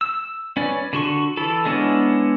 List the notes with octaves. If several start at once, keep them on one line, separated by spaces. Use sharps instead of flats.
E6
C#4 B4 D5
D3 F#4 C#6
E3 E4 A4
G#3 B3 C#4 D4 E4